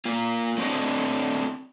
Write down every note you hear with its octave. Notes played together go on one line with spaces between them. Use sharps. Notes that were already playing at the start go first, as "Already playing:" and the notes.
A#3 F4
A3 C4 D4 F#4 D#5